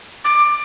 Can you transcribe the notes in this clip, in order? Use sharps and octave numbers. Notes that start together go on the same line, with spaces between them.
D6